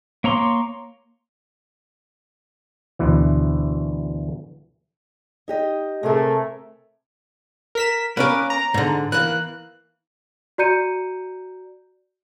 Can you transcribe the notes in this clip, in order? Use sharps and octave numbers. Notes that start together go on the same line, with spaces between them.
A#3 C#5 A#5 C6 D6
D2 B2 E3
D#4 G4 D#5
C3 A3 G#4 A#4
A#4 B6 E7
A#3 C#4 A#4 B4 D6
A#5
G#2 D3
E3 A#3 F#6
F#4 D5 A#5 G6 C#7 D#7